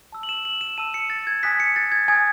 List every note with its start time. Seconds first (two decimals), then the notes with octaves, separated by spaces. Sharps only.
0.12 A5 E6
0.23 F#7
0.29 E7
0.45 F#7
0.61 E7
0.78 A5 E6 D#7
0.94 C#7
1.10 A6
1.27 G#6
1.43 G#5 D#6 F#6 B6
1.60 C#7
1.76 A6
1.92 G#6
2.08 G#5 D#6 F#6 G#6